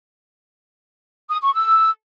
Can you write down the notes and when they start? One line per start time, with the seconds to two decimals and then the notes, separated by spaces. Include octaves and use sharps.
1.30 D#6
1.42 C#6
1.54 E6